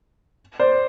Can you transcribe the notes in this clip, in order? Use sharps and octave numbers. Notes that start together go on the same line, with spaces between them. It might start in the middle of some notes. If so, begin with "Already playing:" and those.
C5 D5